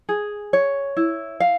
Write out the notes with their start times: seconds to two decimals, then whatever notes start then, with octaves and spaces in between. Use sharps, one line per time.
0.09 G#4
0.53 C#5
0.97 E4
1.40 F5